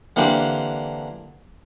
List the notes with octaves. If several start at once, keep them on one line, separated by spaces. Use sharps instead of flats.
D3 E3 A#3 C4 D4 G4